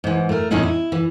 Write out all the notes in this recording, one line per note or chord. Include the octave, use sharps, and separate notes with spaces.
G#2 E3
A3 A#4
E2 A2 C#4 D#4 E4
E4
E3